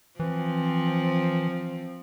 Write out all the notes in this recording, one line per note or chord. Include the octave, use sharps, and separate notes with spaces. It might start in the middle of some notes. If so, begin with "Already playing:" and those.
E3 F3 C4